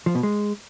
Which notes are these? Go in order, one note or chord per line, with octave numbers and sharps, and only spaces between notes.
F3
B2
G#3